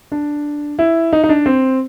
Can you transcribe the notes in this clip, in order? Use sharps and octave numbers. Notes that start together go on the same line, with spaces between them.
D4
E4
D#4
D#4
D4
C4